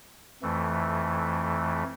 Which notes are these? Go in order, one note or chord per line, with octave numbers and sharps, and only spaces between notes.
F2 E3 A3